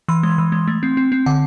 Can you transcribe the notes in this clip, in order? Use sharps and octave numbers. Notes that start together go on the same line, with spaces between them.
E3 C6
G#3
E3
G#3
A3
C4
C4
C4
D3 F#5